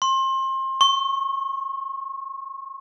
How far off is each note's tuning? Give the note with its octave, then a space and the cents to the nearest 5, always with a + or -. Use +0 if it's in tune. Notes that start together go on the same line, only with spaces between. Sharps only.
C6 +30
C#6 -30